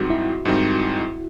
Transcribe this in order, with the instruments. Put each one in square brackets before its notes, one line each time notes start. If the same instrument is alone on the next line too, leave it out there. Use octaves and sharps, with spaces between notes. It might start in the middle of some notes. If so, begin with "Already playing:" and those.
Already playing: [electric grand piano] G#2 D#3 G3 C4 D#4 [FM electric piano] F#4
[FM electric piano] E4
[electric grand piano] G#2 D#3 G3 C4 D#4